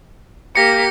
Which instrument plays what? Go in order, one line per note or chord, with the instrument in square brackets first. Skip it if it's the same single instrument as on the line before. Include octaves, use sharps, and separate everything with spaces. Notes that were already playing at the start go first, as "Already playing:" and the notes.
[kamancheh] A#3 G4 [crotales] A#6 C#7